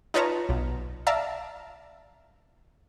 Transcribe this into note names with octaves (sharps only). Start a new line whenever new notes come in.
D#4 F4 B4 C#5 A5 A#5
B1
D5 E5 F5 A5 A#5 E6